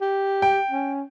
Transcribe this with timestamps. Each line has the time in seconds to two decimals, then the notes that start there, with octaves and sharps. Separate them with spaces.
0.01 G4
0.42 G5
0.71 C#4